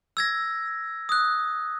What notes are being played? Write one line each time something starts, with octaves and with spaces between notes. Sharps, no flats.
E6 G#6 A#6
D#6 F#6